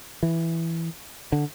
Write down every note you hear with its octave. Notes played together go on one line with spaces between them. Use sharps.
E3
D3